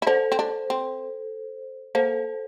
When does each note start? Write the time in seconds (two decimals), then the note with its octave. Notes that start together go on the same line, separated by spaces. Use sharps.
0.02 E4
0.07 D4 A4 C5
0.32 C4
0.39 D4
0.70 C4
1.95 A#3 A4 C5